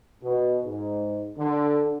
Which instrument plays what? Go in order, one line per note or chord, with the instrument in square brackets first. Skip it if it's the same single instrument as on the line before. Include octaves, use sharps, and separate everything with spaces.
[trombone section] B2
G#2
D3